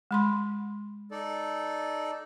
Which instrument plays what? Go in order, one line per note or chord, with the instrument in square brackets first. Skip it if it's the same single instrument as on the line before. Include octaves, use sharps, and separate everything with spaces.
[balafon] G#3 B5 C6
[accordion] D#4 A4 D5